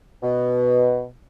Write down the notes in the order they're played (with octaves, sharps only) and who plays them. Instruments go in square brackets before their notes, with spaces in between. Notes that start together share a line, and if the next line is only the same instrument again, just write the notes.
[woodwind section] B2